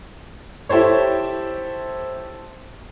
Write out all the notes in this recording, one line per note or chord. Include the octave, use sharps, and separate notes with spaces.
E4 G4 A4 C5 C#5